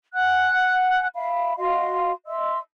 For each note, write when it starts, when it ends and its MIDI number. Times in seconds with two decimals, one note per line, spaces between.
0.13 1.06 78
0.13 1.06 80
0.13 1.06 90
1.15 1.54 76
1.15 1.54 77
1.15 1.54 83
1.57 2.11 66
1.57 2.11 75
1.57 2.11 77
1.57 2.11 84
2.27 2.58 75
2.27 2.58 76
2.27 2.58 84
2.27 2.58 88